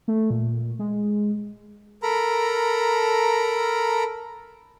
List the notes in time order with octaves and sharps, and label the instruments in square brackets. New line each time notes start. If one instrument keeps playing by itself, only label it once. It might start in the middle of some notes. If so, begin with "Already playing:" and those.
[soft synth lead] A3
A#2
G#3
[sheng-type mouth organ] A4 A#4 A#5 B5